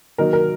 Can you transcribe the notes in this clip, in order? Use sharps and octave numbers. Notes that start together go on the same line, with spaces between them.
D#3 F#3 A#3 D#4 A#4
A#4